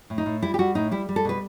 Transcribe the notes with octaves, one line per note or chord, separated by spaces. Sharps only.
A2
D#4
A2
G3 E4
G4
G3 F#4
A2 D#4
G3 E4
G3
A4
B2 B4